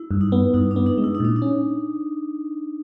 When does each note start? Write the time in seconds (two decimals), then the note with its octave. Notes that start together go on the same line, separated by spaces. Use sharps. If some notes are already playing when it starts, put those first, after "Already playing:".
Already playing: E4
0.11 G2
0.21 D#4
0.32 B3
0.54 G2 D#4
0.71 D4
0.76 B3
0.86 D#4
0.98 G#3
1.04 E4
1.15 D#4
1.20 A#2 D4
1.36 D#4
1.42 C#4